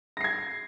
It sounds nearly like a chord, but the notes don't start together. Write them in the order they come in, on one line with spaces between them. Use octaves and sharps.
A#6 C7 G#6